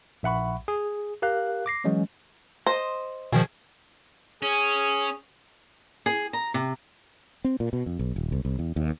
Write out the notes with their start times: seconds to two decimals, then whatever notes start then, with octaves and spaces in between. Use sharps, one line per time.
0.23 A#1 E5 F#5 B5 C#6
0.68 G#4
1.22 G4 A#4 F5 F#6
1.66 D6 A#6 C7
1.84 E3 F#3 G#3 C#4
2.66 C5 D#5
3.32 B2 D#3 F3 G#4
4.42 C#4 G#4
6.06 G#4
6.33 A#5
6.54 C3
7.44 C4
7.60 A#2
7.73 B2
7.86 F2
7.99 B1
8.16 D#1
8.32 C2
8.45 C2
8.59 E2
8.76 D#2